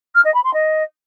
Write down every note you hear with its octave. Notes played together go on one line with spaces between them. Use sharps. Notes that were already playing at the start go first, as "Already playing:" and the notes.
F6
D#5
B5
C6
D#5